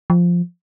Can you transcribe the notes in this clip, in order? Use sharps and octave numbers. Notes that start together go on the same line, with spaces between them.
F3